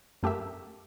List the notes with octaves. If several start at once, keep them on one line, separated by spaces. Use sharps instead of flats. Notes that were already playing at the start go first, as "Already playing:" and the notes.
F#2 A3 G4 A#4 E5